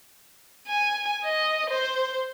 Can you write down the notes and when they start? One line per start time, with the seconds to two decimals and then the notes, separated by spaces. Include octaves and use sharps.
0.68 G#5
1.25 D#5
1.70 C5